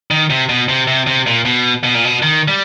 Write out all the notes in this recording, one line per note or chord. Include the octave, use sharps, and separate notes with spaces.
D#3
C3
B2
C3
C3
C3
A#2
B2
B2
A#2
B2
D#3
G3